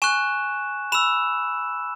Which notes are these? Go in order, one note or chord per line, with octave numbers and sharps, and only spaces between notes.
G#5 C#6 F#6 E7
B5 E6 E7